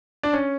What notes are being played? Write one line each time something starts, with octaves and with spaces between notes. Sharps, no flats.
D4
C#4